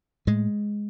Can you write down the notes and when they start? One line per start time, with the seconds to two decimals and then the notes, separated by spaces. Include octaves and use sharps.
0.27 A2 G#3